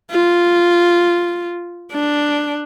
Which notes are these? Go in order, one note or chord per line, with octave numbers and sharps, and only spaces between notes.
F4
D4